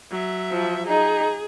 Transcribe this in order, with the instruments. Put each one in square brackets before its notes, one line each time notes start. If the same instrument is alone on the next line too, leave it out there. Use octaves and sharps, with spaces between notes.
[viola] F#3 E5
[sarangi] F3
[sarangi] D#4 [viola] G#4